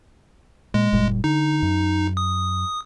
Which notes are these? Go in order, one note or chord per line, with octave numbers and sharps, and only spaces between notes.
A#2 G#3
F#1 A#2 G3
D3 D#4
F#2
D#6